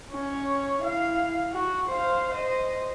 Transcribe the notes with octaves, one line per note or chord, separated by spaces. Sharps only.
C#4 C#5
E4 F5
F#4
C5 F5
C5 D#5